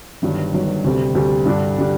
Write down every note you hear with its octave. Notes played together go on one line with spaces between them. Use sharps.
G1 G2 D#3 F#3
G1 G2 D#3 F#3
D2 C3 G3 C4
D2 C3 G3 C4
G2 D3 G3 D4
D3 G3 D4